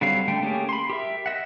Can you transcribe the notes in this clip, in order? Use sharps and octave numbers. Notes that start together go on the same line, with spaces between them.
D3 F#3 G3 C4 F5
D3 A3 G5
A3 A#3 C#4 G4 G#4
B5 C6
G4 A#4 E5
D#5 E5 F#5